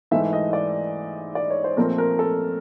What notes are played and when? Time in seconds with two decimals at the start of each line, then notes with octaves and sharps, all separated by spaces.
0.11 G#2 E3 A3 E5
0.33 D#5
0.53 D5
1.35 D5
1.50 C#5
1.64 C5
1.77 A#2 F3 A3 C4 A#4
1.98 A#4
2.19 A4